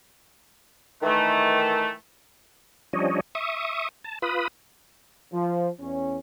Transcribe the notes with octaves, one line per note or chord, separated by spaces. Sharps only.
D#3 E3 A3
F3 G3 C#4 D4 C#5 D#5
E5 C#6 D#6
A5
F4 B4 B5 D#6
F3
E2 C#4